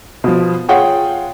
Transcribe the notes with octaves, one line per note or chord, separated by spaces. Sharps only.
B2 F3
F4 G#4 C#5 F#5 G5